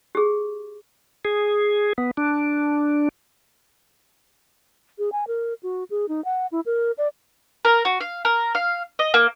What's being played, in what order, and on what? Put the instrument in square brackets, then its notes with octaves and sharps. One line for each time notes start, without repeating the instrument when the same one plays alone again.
[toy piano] G4 G#4
[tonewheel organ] G#4
B3
D4
[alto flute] G#4
G#5
A#4
F#4
G#4
D#4
F#5
E4
A#4
D5
[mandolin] A#4
F#4
F5
A#4
F5
D#5
A#3